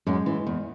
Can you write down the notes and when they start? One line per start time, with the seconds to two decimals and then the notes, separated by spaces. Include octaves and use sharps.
0.07 F#2 G#3
0.26 E3
0.47 E2